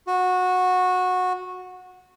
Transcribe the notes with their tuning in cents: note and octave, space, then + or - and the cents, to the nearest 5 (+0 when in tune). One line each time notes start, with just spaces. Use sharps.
F#4 -15